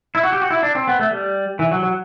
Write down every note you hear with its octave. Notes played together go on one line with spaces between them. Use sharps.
E4
F#4
G4
F#4
E4
D4
C4
B3
A3
G3
E3
F#3
F#3